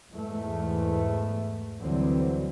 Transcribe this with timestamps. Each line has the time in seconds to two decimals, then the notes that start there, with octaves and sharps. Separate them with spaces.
0.11 E2 G#2 E3 A3
1.80 D2 D3 E3 F#3 G3 C4